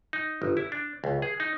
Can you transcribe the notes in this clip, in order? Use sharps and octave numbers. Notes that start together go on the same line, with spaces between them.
D#4
G1
E4
D4
C#2
G#4
D#4